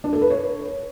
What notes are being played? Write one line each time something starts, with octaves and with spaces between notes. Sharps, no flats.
D4
A4
B4
C#5